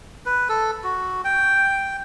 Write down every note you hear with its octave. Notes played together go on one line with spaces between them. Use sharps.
B4
A4
F#4
G5